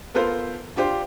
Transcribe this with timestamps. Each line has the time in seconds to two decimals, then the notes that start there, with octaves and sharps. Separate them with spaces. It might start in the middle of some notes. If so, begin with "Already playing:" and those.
0.15 B3 F4 A4 A#4 C5
0.76 D4 F4 G4 C5